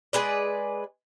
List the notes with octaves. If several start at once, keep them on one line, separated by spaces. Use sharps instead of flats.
G#3 G#4 B4 D5